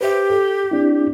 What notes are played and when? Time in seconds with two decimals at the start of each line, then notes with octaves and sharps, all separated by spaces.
0.01 G4 B4 C5 E5
0.30 A4
0.71 C4 D4 E4